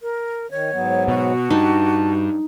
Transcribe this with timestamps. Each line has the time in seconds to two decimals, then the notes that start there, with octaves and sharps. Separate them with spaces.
0.01 A#4
0.51 D#3 C#5
0.73 G#2 F#3 B3
1.08 B2 F#4
1.50 G2 D#4 A5